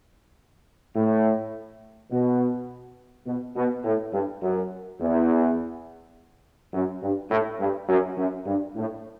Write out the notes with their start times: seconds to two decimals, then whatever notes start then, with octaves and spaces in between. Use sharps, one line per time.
0.96 A2
2.11 B2
3.27 B2
3.56 B2
3.85 A2
4.13 G2
4.42 F#2
5.00 E2
6.73 F#2
7.02 G2
7.31 A2
7.60 G2
7.89 F#2
8.18 F#2
8.47 G2
8.75 A2